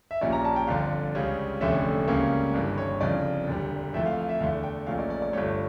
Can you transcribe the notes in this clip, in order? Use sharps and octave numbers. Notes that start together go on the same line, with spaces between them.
E5
A#1 A#2 G3 C#4 D5
A#5
A5
G5
G1 F2 D3 F5
C#2 C#3 G3 C#4
F1 E2 D3 A3 C#4 E5
C#2 C#3 G3 A#3 C#4
G1 G2 E3
C#5
G1 F2 C#3 D5
E1 E2 D3 G3
F2 E3 A3 E5
F5
F5
E5
E2 D3 A3 F5
G5
A#1 A#2 A3 C#4 F5
D5
D5
D5
G1 G2 F3 A3 C#5